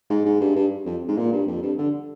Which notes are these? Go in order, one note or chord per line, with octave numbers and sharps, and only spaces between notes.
G#2
G#2
G2
G2
F2
G#2
A#2
G2
F2
G2
D3